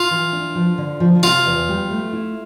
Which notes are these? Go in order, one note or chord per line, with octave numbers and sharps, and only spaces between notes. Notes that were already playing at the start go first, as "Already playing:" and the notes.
Already playing: F4
E3
D4
F3
D3
F3
C3 F4
E2
G3
A3
E4